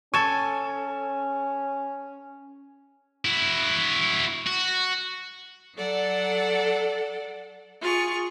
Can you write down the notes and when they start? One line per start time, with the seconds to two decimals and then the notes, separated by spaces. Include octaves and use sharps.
0.14 C#4 A4 G#5 C#6
3.25 E4 F#4
4.46 F#4
5.75 F#3 A4 D5 F#5
7.81 F4 G#4 C#6